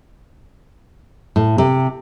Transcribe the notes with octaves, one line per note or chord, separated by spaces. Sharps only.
A2
C3